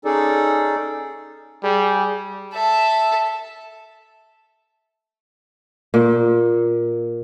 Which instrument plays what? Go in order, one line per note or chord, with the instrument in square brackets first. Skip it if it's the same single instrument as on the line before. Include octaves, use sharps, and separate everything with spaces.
[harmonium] C#4 D#4 G#4 A4 D5
[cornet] G3 [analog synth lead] G#4
[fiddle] A4 E5
[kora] A#2